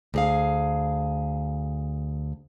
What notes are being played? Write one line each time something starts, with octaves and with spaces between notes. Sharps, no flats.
D2 G#4 F5